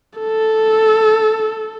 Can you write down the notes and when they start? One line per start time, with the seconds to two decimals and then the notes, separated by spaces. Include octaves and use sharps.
0.20 A4